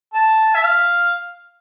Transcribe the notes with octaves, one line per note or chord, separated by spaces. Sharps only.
A5
E5
F5